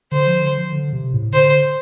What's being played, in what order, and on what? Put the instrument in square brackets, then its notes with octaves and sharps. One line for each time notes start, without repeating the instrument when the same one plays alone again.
[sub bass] D3 [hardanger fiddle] C5
[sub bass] F3
D3
F3
D3
C3
A2
[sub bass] D3 [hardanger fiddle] C5